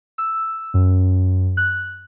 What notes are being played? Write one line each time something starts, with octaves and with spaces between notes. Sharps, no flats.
E6
F#2
F#6